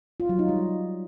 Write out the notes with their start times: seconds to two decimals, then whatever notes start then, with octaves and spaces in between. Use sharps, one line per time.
0.20 F4
0.29 F#3
0.39 D#4
0.49 G3